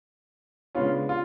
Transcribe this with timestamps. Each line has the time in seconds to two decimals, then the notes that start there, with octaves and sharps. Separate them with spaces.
0.75 C#3 G#3 B3 C#4 D4 F4
1.09 F4